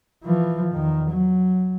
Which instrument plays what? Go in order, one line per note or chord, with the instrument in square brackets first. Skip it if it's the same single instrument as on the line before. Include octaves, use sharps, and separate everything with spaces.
[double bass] E3 F3
E2 D#3
F#3